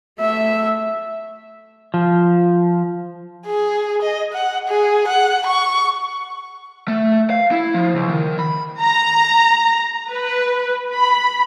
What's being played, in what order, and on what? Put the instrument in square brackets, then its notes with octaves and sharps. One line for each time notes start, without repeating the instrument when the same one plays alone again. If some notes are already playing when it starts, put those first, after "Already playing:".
[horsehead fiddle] A3 E5
[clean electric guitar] F3
[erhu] G#4
D#5
F#5
G#4
F#5
C#6
[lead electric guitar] A3
F5
E4
F3
C#2
D#3
B5
[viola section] A#5
B4
B5